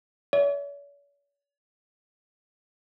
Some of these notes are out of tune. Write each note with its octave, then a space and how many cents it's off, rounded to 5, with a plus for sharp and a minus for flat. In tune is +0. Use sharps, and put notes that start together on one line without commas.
C#5 +45 E5 -15